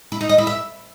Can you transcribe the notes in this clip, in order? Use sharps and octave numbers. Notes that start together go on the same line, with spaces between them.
E4
D#4
D#5
E4
E5